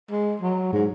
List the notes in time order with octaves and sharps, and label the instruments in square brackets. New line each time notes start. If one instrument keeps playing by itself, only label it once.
[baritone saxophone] G#3
F#3
G#2